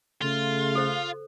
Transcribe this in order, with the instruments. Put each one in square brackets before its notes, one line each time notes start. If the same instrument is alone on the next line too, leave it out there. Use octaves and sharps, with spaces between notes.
[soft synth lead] C#3 [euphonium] A3 [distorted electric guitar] F4
[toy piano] A4 C5